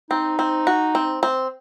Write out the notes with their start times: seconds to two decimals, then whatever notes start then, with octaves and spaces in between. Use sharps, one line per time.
0.10 C4 D#4
0.39 C4
0.67 F#4
0.95 C4
1.23 C4